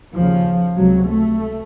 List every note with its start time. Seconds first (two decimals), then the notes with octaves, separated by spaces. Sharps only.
0.15 D#2 C#3 F3
0.76 C#2 C3 F#3
1.07 A3